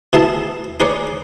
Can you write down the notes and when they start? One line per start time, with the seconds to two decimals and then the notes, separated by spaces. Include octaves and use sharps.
0.13 B2 E4 G#4 E5 A5
0.80 D#4 G#4 B4 C#5 D5